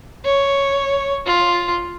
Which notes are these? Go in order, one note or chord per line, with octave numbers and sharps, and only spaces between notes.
C#5
F4